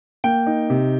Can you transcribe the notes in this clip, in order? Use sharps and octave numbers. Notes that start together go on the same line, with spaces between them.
A#3 G5
D#4
C3